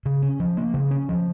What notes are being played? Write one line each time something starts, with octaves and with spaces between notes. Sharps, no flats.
C#3
C#4
F3
A#3
C#3
C#4
F3